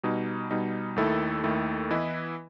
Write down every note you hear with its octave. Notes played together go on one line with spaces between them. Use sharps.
B2 G3 D#4
B2 G3 D#4
D#2 D#3 A3 E4 A4
D#2 D#3 A3 E4 A4
E3 B3 E4 B4 D#5